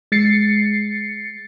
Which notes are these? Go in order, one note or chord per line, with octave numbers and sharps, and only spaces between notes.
G#3 A6 C7 C#7